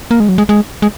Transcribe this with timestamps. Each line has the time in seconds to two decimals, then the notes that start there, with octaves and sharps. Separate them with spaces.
0.11 A#3
0.20 G#3
0.29 F#3
0.38 G#3
0.49 G#3
0.82 G#3